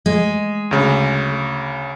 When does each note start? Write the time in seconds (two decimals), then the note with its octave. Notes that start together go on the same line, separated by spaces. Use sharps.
0.06 G#3
0.71 D2 C#3